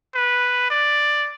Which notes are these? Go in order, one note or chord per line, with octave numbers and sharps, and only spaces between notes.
B4
D5